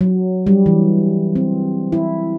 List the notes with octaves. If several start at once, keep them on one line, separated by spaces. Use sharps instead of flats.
F#3
G3
E3
C4
E4